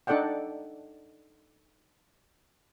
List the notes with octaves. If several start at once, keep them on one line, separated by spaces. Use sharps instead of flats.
D4 D#4 A4 D5 F#5 G5